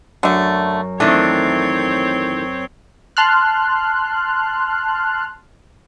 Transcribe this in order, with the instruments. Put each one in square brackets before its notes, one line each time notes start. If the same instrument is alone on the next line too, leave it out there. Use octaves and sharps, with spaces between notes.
[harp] F#2 [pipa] D3 A3
[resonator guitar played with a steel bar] D#3 E3 A3 [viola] C4 C#5 [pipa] D4
[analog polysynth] A5 C6 F6 F#6